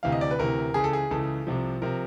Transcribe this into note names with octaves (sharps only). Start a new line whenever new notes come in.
D2 C3 E3 F5
D#5
D5
B4
D2 C3 E3 A#4
C#2 C#3 E3 G#4
A4
G#4
C#2 C#3 E3 A4
C2 C3 F3
C3 F3 A#4